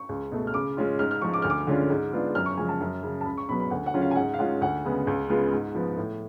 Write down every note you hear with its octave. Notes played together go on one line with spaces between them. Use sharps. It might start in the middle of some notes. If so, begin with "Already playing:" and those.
Already playing: C#6
C#2
B2 A3
F6
C#3 D6
G#3 C#4 F4
G#2 F6
F6
F3 G#3 C#6
D6
D2 F6
D6
D3 G#3 C#4 F4
G#2
G#3 B3 D4 F4
F#2 F6
C#6
C#3 F3 G#3 G#5
A5
F#2
C#3 F#3
A5
C#2 B5
C#6
B2 F#3 B3 B5
B5
D2 F#5
F#5
C#3 F#3 C#4 F4
F5
G#5
G#2 F#5
F5
G#3 C#4 F4 F#5
D2 F#5
C#3 G#3 B3
C#2
C#3 G#3 B3 F4
G#2
F3 B3
A2